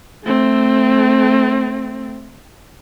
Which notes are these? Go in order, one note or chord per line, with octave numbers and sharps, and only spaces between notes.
A3 C4